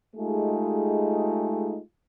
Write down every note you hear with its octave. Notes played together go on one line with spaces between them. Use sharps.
G#3 A3 D#4 F4 G4 G#4